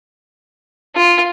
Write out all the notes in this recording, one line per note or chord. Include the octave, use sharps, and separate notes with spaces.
F4